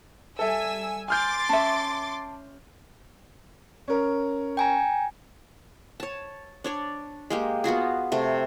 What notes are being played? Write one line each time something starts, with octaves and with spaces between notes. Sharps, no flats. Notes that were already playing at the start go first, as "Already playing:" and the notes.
G3 A4 E5 G#5 E6
G#5 C6 D6 F6 G6 A6
C#4 E5 A5
C#4 A#4
G5 G#5 A#5
C#5 A5
D4 C#5 D5
G#3 A#3 G4
B3 F4 F#4 G#4
C3 A3